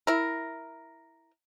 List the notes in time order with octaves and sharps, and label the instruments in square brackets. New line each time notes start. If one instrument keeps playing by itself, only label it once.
[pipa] E4 A#4